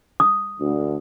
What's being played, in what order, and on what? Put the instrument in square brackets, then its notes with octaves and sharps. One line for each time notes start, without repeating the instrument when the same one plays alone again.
[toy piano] D#6
[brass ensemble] D2 D3